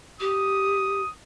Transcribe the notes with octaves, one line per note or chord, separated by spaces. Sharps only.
G4 D#6